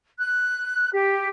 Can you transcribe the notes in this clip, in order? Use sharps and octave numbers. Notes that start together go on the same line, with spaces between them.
F#6
G4